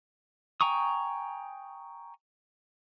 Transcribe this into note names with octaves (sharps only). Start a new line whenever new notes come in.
G5 G#5 A#5 C#6 D#6